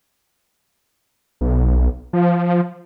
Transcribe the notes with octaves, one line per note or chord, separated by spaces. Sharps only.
B1
F3